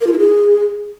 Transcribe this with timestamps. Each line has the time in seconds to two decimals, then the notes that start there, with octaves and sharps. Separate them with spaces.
0.01 A#4
0.07 F4
0.13 E4
0.19 G#4